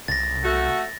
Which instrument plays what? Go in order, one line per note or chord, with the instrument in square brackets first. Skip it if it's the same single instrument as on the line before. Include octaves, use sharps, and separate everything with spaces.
[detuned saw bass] C2 [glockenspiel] A6 A#6
[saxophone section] A3 F#4